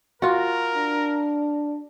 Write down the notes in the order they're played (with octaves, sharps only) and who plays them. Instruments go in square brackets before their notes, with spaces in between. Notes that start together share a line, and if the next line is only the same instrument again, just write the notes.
[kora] F4 F#4 [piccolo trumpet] A#4
[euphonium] D4